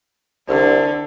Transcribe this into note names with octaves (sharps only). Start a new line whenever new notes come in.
C2 D3